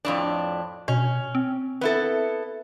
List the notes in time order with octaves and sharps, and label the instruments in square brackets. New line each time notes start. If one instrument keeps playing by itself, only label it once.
[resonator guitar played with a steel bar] F2 A2 D4
[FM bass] B2 [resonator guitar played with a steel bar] C#4
[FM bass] C4
[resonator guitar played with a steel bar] B3 E4 A4